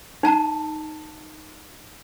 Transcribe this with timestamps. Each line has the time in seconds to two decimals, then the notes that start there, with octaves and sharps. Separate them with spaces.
0.23 D#4 A5 A#5